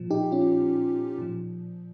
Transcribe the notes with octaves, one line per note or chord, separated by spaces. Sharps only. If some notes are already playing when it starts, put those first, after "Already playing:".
Already playing: A#2 F3
D#4 G4
C#4 F4
A#2 F3